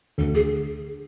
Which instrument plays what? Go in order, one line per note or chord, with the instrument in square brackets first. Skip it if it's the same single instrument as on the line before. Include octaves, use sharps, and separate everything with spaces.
[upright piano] D2 [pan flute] A4
[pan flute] G#4